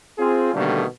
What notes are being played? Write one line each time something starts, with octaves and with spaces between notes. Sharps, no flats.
C4 F4 G#4
B2 D3 D#3 G3 A3 A#3